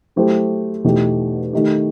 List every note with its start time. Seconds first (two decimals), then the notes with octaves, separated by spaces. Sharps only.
0.16 F#3 A3 E4 G4 C5
0.84 E2 B2 A3 D#4 G4
1.53 D#3 A3 D#4 G4